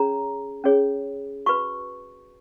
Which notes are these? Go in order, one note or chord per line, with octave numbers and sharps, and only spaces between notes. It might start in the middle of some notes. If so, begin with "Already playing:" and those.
Already playing: C#4 G#4 C#5 A#5
C#4 G#4 C#5
F#4 B4 C#6